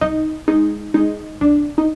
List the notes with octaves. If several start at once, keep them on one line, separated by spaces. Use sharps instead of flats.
C2 D#4
G#3 D#4
G#3 D#4
C2 D4
D#4